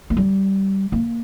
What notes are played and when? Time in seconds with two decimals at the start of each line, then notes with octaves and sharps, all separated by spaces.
0.10 A#3
0.17 G3
0.92 A#3